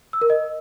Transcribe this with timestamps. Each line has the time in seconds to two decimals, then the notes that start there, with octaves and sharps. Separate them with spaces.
0.13 E6
0.22 A#4
0.30 D#5